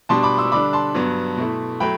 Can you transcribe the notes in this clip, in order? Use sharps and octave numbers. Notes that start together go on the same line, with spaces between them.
B2 G3 D4 A5 C6
B5 D6
C6 E6
D3 G3 D4 B5 D6
A5 C6
G2 F#3 B3
B2 A3 E4
F#3 A3 G5 B5